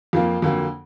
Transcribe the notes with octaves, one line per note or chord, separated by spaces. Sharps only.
F2 F3 A#3 F4
F2 D3 F#3 A#3